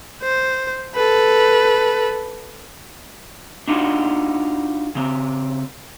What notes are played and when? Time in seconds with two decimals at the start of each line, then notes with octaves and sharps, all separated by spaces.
0.23 C5
0.95 A4 B4
3.68 D4 D#4 F4 F#4
4.95 C#3 C4